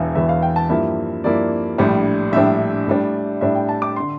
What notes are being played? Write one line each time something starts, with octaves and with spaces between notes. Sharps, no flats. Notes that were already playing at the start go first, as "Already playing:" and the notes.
Already playing: E1 E2 E3 E5 F5
E1 E2 E3 E5
F5
G5
A5
G2 F3 A#3 E4 E5
G2 F3 A#3 E4 D5
A#1 A2 G3 D4
A#1 A2 G3 D4 E5
A2 G3 D4
A2 G3 D4 E5
G5
A5
D6
D3 C6